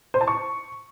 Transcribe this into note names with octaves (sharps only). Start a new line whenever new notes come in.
C5
A5
C#6